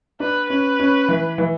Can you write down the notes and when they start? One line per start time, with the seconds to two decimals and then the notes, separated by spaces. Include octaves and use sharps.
0.20 D4 B4
0.49 C#4 B4
0.80 C#4
1.08 E3
1.38 E3